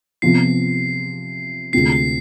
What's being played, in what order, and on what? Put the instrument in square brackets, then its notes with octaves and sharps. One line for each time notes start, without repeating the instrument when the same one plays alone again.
[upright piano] C3 F3 B3 F4 [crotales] C7
[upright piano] D2 C3 G#3 C4 F4 [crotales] C7
[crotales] C7